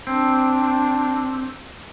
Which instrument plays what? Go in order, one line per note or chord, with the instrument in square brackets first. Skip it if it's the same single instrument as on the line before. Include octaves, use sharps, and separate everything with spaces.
[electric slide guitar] C4 [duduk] D4